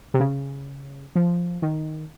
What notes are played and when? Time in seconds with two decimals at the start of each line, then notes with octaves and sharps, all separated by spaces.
0.14 C3
0.20 C#3
1.15 F3
1.62 D#3